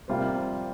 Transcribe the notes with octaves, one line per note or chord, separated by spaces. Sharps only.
C3 G3 A#3 F4 C5